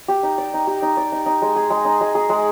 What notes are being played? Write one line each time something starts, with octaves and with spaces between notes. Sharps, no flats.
G4
D#4
D5
D#4
G4
D#4
D5
D#4
D#4
G#3
G#4
G#3
D#4
G#3
G#4
G#3